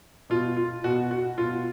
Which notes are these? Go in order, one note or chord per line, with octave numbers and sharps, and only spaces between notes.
B2 F4
F4
B2 F#4
F#4
B2 F4